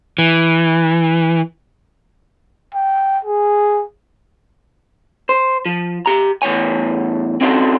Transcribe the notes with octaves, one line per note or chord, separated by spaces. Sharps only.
E3
G5
G#4
C5
F3
G4 A#5
E2 A2 C#5 G#5
C4 C#4 D#4 F4 F#4 A4